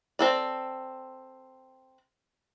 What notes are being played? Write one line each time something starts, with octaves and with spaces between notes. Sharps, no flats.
C4 A4 D5